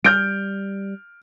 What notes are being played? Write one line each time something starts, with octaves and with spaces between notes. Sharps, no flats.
G3 F6 G6 D7